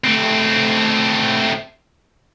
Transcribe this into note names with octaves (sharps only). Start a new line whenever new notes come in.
A3 C4